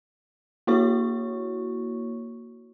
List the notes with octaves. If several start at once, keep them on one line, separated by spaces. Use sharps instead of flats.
A#3 E4 F#4 C#5 C#6